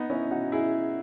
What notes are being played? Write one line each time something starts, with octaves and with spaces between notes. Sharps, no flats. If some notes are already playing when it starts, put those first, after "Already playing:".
Already playing: B3 D#4
C#4 E4
D#4 F#4
E4 G#4